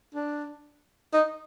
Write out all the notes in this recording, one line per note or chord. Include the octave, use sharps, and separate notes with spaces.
D4
D#4